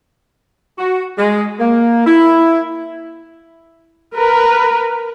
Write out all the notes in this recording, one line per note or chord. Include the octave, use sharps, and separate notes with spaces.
F#4
G#3
A#3
E4
A#4 B4